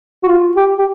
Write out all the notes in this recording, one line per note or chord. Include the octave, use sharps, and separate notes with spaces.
F#4
F4
G4
G4